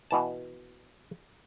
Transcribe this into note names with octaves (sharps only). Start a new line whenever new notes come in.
B2 E3 A5